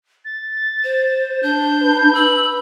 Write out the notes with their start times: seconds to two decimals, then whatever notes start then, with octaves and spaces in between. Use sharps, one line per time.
0.25 A6
0.84 C5
1.43 D4 G6
1.83 B4
2.15 E6 F#7